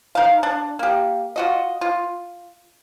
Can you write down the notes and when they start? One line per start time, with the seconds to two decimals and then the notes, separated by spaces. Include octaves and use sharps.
0.15 D#4 F5
0.43 D4
0.79 A#3 G4
1.36 F4 F#4 D#5
1.81 F4